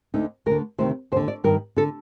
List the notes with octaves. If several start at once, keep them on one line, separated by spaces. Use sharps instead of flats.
D2 D3 D#4
D2 D3 A#4
D2 C3 D#3 C5
D#2 D3 C5
D5
G2 D#3 A#4
D3 A4